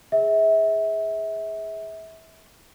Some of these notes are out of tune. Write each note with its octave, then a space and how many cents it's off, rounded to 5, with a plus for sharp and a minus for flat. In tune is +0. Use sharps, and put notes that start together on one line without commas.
G#4 +0 E5 -30